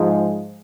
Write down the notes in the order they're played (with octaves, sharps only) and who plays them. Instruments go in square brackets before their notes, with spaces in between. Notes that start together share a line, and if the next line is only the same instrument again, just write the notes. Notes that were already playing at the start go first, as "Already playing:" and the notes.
Already playing: [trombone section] G#2 F3 G#3